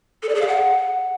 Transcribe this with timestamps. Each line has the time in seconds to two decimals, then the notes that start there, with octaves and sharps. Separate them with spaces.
0.23 A4
0.29 D5
0.35 G#4
0.41 F5
0.47 F#5